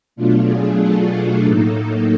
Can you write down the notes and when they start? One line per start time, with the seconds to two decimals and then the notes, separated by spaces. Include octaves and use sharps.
0.16 B2 F#3 A3 D4 F4
0.48 G#4
0.80 A4
1.45 A2 F#3 A#3 D#4 A4